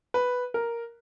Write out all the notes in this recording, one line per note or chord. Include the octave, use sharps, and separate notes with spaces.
B4
A#4